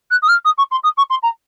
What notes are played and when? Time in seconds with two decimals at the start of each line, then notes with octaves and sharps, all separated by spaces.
0.10 F#6
0.22 D#6
0.28 F6
0.45 D#6
0.58 C#6
0.71 C6
0.83 D#6
0.97 C#6
1.10 C6
1.23 A#5